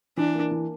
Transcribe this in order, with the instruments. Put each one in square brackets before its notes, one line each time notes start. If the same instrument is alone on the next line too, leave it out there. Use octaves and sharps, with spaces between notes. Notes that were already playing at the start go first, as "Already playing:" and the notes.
[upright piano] E3 [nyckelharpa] D4
[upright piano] A#3
E3